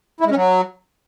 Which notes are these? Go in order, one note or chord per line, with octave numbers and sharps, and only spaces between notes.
E4
G#3
C#4
F#3